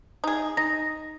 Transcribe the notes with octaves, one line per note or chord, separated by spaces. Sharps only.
D#4 G#4
D#4 A#6